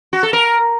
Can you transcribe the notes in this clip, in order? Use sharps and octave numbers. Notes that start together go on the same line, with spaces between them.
F#4
A4
A#4